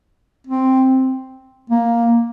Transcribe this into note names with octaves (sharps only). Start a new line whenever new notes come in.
C4
A#3